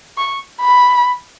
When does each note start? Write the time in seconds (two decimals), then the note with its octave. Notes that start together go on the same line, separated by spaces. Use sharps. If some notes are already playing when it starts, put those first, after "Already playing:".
0.18 C#6
0.62 B5